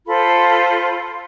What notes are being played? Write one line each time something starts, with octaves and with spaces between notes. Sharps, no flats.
F4 A4 C5 B5